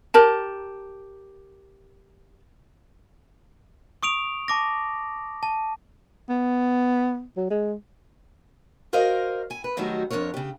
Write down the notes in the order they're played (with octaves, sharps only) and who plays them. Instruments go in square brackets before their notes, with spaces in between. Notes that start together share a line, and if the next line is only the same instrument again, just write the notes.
[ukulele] G4 A#4 A5
[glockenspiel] C#6 D#6 D7 F7
A5 D6 A#6
A5
[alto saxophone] B3
F#3
G#3
[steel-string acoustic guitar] F#4 A#4 C5 D5 D#5 F5
E4 G#5
B4
D#3 F#3 G3 A3 D#4 F#4
F2 B2 D4 A#4 C#5
C#3 G4